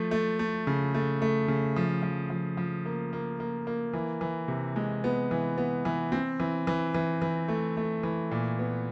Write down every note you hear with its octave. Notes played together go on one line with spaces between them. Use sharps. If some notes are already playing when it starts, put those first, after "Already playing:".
Already playing: F3 A3
A3
A3
C#3
A3
A3
C#3
F3
F3
F3
F3
A#3
A#3
A#3
A#3
E3
E3
C3
G#3
B3
E3
B3
E3
C4
E3
E3
E3
E3
A3
A3
E3
A#2
B3